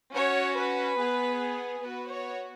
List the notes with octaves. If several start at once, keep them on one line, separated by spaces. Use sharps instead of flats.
C#4 F#4 C#5
B4
B3 G#4
B3 F#4 B4
C#5